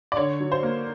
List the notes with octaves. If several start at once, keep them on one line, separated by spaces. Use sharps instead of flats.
D5
D3 C#5
F#3
C5
A#3